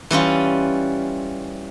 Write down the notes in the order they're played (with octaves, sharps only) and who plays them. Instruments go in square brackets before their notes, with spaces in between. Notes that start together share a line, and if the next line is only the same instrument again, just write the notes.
[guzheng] E3 G3 C#4 F4